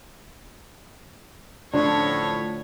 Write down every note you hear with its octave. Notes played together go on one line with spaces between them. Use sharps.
A2 D3 F3 C#5